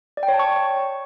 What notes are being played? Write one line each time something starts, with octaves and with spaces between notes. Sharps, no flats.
D5
G5
C#5
A5
C#6